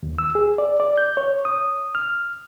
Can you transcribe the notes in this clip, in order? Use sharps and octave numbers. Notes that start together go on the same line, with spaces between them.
D#2
E6
G#4
D5
D5
G6
C#5
D#6
F6